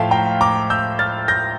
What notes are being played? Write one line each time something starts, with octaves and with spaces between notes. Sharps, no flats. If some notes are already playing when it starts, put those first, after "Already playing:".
Already playing: A2 F3 A3 E5 F5 G5 A5
G5 A#5
A#5 D6
E6 G6
F6 A6
G6 A#6